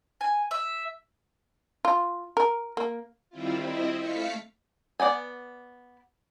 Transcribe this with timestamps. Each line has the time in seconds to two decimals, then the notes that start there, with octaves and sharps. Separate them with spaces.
0.21 G#5
0.51 E5
1.85 F4
2.37 A#4
2.77 A#3
3.30 D#3 G3 C4 E4 F4
3.59 C4 E4 D#5
3.97 A3 F5 B6 C#7
5.00 B3 D5 G5 G#5